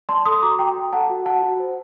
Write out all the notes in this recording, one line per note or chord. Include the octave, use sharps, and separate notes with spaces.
D5 A5 C6
A4 C6 D#6
F#4 A#5 D6
F#4 G5 A#5
D5
A4 F#5 A5
F#4
F#4 F#5 A5
F#4
C5